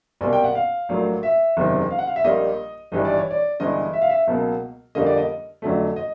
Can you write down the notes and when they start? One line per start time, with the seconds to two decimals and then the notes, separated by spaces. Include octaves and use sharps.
0.21 C2 B2 G3 A#3 G#5
0.33 G5
0.44 F#5
0.55 F5
0.89 A#1 A2 F#3 A#3
1.23 E5
1.57 F#1 E2 C3 D#3 G#3
1.91 F5
1.99 F#5
2.07 F5
2.16 E5
2.24 A#1 A#2 G3 A#3 D#5
2.92 G#1 G2 E3 G3 D#5
3.05 D5
3.18 C#5
3.31 D5
3.60 G1 G2 E3 G#3 D#5
3.93 E5
4.02 F5
4.10 E5
4.27 C#2 B2 F#3 A#3
4.95 F2 D3 G3 A#3 D#5
5.06 D5
5.17 D#5
5.62 F2 D3 F#3 A3
5.96 D#5